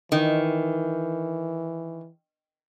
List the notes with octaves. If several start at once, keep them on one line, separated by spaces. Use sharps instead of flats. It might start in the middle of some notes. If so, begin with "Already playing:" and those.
D#3 E3